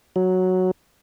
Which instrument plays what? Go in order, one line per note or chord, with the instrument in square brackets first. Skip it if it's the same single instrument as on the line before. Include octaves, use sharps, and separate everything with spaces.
[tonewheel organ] F#3